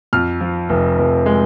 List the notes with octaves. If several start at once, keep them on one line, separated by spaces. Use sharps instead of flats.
F2 F6
F3
F1
F1
G#3